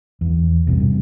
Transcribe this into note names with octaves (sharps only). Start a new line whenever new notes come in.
E2
B1 G2 C3